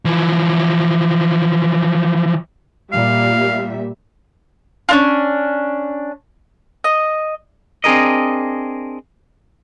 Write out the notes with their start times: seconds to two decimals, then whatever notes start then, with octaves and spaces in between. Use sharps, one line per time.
0.05 E3 F3
2.93 A#2 G3 E5 F5
4.89 C#4 D4 F4
6.84 D#5
7.84 C4 D4 G#4 A#4 D#5